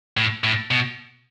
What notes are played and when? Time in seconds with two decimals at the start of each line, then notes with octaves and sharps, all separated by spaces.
0.17 A2
0.44 A2
0.71 B2